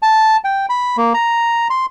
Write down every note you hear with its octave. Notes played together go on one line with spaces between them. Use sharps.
A5
G5
B5
A#3
A#5
C6